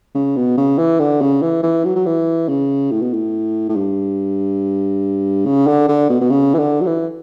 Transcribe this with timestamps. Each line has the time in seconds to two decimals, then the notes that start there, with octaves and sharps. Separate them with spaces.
0.15 C#3
0.36 B2
0.57 C#3
0.78 E3
1.00 D3
1.21 C#3
1.42 E3
1.63 E3
1.85 F#3
1.96 F#3
2.06 E3
2.48 C#3
2.91 A2
3.02 B2
3.13 A2
3.69 A2
3.76 G2
5.46 C#3
5.67 D3
5.88 D3
6.10 B2
6.21 B2
6.30 C#3
6.54 E3
6.58 D3
6.81 F#3
6.87 E3